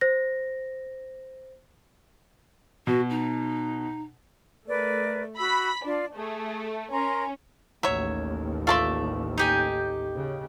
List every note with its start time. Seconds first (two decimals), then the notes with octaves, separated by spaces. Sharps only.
0.01 C5 A#6
2.87 B2 F#4
3.10 D#4
4.67 A3 A#4 B4 D5
5.37 F#4 B5 E6 B6
5.84 D4 F4 D5
6.15 A3 G#4
6.91 C#4 A#4 A#5 C6
7.83 A1 D#2 F#3 C#5 E5
8.67 A3 F4 D5 E5 A5 C6
9.38 D#4 G4 G#5
10.16 C#3